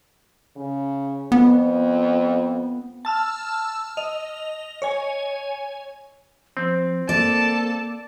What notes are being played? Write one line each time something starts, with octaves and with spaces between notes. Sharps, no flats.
C#3
F2 B3
A5 E6 F6
D#5 F7
C#5 G#5
F3 C4
A#3 A4 D5 A5